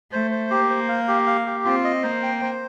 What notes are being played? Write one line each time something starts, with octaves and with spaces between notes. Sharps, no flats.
A3 C5
C5
A#3 G4
C5
F5
G4
F5
G4
C4 F4
D#5
A#3 C5
G5
C5